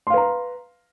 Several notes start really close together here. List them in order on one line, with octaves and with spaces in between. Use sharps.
C6 F5 B4 A#5